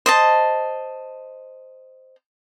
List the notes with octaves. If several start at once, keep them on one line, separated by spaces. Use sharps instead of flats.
C5 D#5 A5